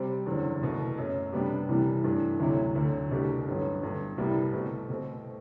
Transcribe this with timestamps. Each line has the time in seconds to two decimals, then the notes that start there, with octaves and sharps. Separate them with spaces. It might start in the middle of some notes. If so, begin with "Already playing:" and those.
Already playing: C3 G3 C4 G4 C5
0.26 F#1 E2 D3 F#3
0.61 C2 B2 A3
0.98 F#2 F#3 A3
1.33 C3 G3 B3 D4 G4
1.69 C2 C3 E3 G3
2.04 G2 E3 A3 D4
2.40 D2 C3 F#3 A3 E4
2.76 D2 D3 F#3
3.11 C2 B2 A3 D4 G4
3.46 A1 G2 D3 F#3 B3
3.82 G1 G2 D3
4.18 C2 C3 G3 B3 E4
4.53 B2 A3 C4
4.89 B2 A3 C4